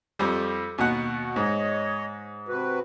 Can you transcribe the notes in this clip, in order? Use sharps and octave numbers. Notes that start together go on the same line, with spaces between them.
F2 G3
D#2 B2 F#4 F#5
G#2 C#5 D#5
C3 F#4 B4